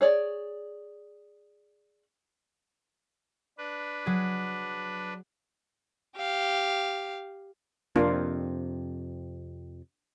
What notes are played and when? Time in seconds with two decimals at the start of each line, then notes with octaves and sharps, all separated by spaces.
0.01 G#4 C#5 D5
3.58 D4 B4
4.06 F#3 G#4
6.17 G4 F5
7.96 F2 C3 A#3 D4 F4